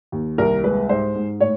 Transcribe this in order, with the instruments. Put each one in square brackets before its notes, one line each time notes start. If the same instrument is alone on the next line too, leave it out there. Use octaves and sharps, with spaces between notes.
[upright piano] D#2
C2 A#4
G#3 B4
G#2 C5
G#2
A2 C#5